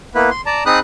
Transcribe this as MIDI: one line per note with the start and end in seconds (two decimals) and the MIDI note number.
0.15 0.30 58
0.15 0.30 59
0.15 0.30 64
0.15 0.30 71
0.30 0.41 84
0.46 0.64 74
0.46 0.64 81
0.46 0.64 82
0.66 0.79 60
0.66 0.79 63
0.66 0.79 68
0.66 0.79 83
0.66 0.79 87
0.66 0.79 90